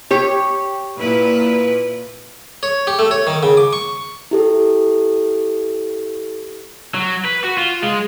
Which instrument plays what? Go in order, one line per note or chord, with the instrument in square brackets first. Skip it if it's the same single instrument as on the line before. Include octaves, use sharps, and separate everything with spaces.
[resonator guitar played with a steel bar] G4 C#5
[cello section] A#2 E4 B4
[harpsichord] C#5
G4
A3
C#5
D#3
C#3
D6
C#6
[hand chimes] E4 G4 A4
[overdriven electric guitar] F#3
B4
F#4
F4
G#3